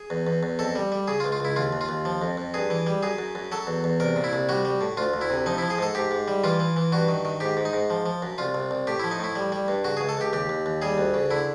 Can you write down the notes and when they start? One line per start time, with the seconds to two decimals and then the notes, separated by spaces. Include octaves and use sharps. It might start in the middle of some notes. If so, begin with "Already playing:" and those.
Already playing: G#4
0.10 E2
0.27 E2
0.43 E2
0.59 F2 A4
0.76 G3
0.92 G3
1.08 C#3 G#4
1.20 F4
1.24 C#2
1.32 F4
1.40 C#2 E4
1.56 D#2 F4
1.73 D#2
1.81 F4
1.89 D#2
2.05 F3
2.22 F2
2.37 F2
2.54 G2 G#4
2.70 E3
2.87 G3
3.03 F#2 G#4
3.18 F#2
3.35 F#2
3.52 F#3 A4
3.67 E2
3.84 E2
4.00 C2 A#4
4.16 A#2
4.24 E4
4.33 C2
4.49 G3 F#4
4.65 G3
4.81 A2
4.97 D2 F4
5.14 D2
5.21 E4
5.30 C3
5.46 F3 D#4
5.58 F3 E4
5.70 G#4
5.78 G#2 A4
5.95 G#2 G4
6.11 G#2
6.28 G3
6.44 E3 F4
6.60 E3
6.77 E3
6.92 G2 F#4
7.08 D#3
7.25 D#3
7.40 G#2 G4
7.57 G#2
7.65 D#4
7.73 G#2
7.90 F3
8.06 F3
8.22 F#2
8.38 C2 F4
8.55 C2
8.71 C2
8.87 A2 G4
9.00 F3 E4
9.11 D#4
9.20 A2 E4
9.36 G3
9.52 G3
9.68 G2
9.84 C#3 F#4
9.97 C#2 G#4
10.09 A4
10.17 C#2 G4
10.33 D#2 G4
10.49 D#2
10.66 D#2
10.82 G3 G#4
10.98 D2
11.14 C#3
11.31 D3 E4